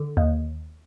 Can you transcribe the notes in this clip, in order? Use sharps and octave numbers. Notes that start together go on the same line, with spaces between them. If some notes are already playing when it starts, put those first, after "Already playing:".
Already playing: D3
D#2